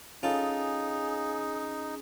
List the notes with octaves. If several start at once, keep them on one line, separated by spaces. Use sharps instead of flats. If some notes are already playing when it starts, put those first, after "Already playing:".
C#4 D#4 F4 G#4 A4